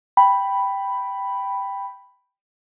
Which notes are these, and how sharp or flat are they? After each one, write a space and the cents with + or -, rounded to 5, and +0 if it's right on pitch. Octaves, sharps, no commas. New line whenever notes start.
G5 +0 B5 +0